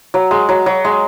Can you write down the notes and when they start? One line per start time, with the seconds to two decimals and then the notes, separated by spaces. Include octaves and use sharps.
0.14 F#3
0.31 G#3
0.49 F#3
0.66 F#3
0.85 G#3